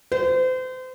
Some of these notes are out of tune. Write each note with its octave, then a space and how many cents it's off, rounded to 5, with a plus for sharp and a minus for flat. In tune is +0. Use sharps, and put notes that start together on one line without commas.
C5 -35